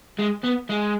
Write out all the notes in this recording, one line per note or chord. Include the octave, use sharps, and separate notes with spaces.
G#3
B3
G#3